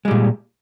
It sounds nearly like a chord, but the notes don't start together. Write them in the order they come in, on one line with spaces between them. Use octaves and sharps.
G#3 G3 A#2